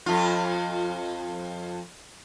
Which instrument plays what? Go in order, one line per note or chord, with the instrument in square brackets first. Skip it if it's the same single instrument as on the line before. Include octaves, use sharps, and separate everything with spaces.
[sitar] F2 F4